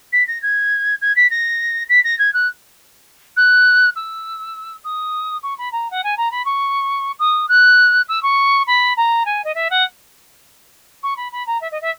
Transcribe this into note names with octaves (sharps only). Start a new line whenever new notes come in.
B6
A#6
G#6
G#6
B6
A#6
B6
A#6
G#6
F#6
F#6
E6
D#6
C#6
B5
A#5
F#5
G#5
A#5
B5
C#6
D#6
F#6
E6
C#6
B5
A#5
G#5
D#5
E5
F#5
C#6
B5
B5
A#5
E5
D#5
E5